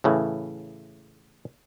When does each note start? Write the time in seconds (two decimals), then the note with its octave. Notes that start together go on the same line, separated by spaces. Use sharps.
0.04 A2 C#3 E3